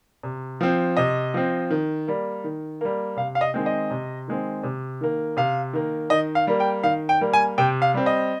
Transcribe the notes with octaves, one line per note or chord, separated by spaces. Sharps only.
C3
F3 C4
C3 D#5
F3 C4
D#3
G3 A#3
D#3
G3 A#3
C3 F5
F5
D#5
D#3 G#3 C4
D#5
C3
D#3 G#3 C4
C3
D#3 A#3
C3 F5
D#3 A#3
D#3 D#5
F5
G3 A#3
G5
D#3 F5
G5
G3 A#3
G#5
C3 G5
F5
G3 C4
D#5